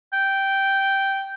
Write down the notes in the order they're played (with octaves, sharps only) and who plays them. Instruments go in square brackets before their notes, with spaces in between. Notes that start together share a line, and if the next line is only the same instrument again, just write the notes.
[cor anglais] G5